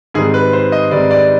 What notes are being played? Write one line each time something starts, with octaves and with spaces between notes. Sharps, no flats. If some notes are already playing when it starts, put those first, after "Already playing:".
G#2 D#3 G3 C4 G#4
B4
C5
D#5
G#2 D#3 G3 C4 D5
D5